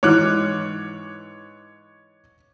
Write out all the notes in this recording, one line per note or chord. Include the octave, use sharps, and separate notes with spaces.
G#2 E3 C#5 D6 F6 F#6